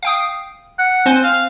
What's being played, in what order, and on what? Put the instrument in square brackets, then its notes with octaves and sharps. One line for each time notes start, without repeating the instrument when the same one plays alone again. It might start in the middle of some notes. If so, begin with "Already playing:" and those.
[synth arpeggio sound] F5 G5 D#6
[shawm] F#5
[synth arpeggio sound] C4 C5 G#5
[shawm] F5